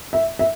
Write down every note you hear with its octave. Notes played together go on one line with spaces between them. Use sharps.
E5
E5